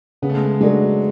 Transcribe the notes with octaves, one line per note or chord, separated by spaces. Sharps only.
C#3 B3
A3
G#3
A3
F#3 G#3 D4 A4